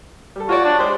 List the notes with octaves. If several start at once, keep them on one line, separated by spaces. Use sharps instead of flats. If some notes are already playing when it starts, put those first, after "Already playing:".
G3 A4
F4 F#4 C#5 D5
D4
G#3 G4 C5 C#5